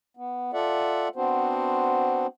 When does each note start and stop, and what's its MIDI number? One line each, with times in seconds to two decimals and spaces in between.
0.17 0.51 59
0.53 1.08 65
0.53 1.08 69
0.53 1.08 74
0.53 1.08 76
0.53 1.08 78
1.16 2.27 59
1.16 2.27 60
1.16 2.27 62
1.16 2.27 66
1.16 2.27 72